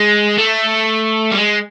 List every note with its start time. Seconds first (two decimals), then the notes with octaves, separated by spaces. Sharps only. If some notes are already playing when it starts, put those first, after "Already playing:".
Already playing: G#3
0.38 A3
1.32 G3
1.37 G#3